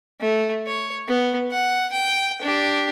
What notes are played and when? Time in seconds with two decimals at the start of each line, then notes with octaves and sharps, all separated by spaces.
0.21 A3
0.67 C#5
1.08 B3
1.51 F#5
1.92 G5
2.41 D4 G4